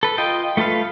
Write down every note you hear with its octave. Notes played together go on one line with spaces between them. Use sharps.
A4 B4
F4 D#5 G5
A3 F4 A4 B4 F5